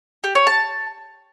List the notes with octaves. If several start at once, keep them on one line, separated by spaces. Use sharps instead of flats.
G4
C#5
A5